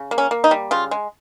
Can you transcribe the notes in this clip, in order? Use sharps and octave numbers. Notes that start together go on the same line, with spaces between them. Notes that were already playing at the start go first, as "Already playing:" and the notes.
Already playing: C#3
A#3
C#4
A#3
D#4
G3
C#3 F4
G#3